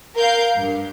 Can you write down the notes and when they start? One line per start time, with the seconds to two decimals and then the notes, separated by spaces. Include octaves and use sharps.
0.18 A#4 F5 G6
0.56 G2